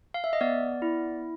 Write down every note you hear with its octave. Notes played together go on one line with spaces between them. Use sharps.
F5
E5
D#5
B3 D5
E4